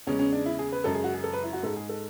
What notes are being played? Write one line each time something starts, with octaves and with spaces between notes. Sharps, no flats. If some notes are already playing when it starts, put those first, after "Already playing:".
E2 C#3 G#3 C#4
C#4
D4
E4
G#4
B4
F#2 C#3 G#3 A4
G#4
F#4
G#4
A4
B4
E4
F#4
G#2 G#3 A4
G#4
A4